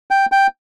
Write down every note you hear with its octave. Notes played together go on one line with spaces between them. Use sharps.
G5
G5